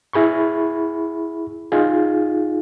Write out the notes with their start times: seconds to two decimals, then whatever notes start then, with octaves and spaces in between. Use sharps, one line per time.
0.13 E4 G#4 B5 C#6
1.72 D#4 F4 G#4